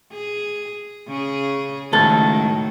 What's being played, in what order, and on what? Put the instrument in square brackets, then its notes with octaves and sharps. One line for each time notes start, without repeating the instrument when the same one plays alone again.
[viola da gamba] G#4
C#3 G#4
[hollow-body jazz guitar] C#2 A4 [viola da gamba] A2 D#3 F#3